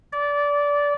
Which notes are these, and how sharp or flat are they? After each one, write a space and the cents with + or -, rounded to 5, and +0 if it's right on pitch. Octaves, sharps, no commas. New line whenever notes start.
D5 -20